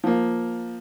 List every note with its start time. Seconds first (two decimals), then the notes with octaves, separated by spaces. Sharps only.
0.04 F3 A#3